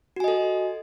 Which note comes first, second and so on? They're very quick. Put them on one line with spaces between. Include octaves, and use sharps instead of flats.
F#4 G#5 D#5 A4